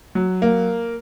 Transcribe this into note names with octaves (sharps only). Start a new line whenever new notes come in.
F#3
A#3